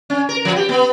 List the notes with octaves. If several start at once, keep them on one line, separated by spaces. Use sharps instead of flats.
C#4
A#4
F3
G4
B3